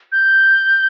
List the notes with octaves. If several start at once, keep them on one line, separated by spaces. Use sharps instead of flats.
G6